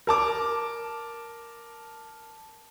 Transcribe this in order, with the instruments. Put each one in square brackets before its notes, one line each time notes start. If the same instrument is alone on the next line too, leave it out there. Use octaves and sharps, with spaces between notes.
[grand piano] A#4 A5 D6